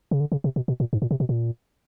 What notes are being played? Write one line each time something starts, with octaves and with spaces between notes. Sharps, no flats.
C#3
D3
C#3
C3
B2
B2
A#2
G#2
A#2
C3
B2
A#2